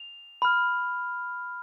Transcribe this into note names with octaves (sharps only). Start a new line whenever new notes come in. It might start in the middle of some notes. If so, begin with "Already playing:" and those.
Already playing: F7
B5 F6